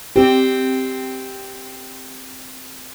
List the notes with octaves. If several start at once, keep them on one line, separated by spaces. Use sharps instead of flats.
C4 G4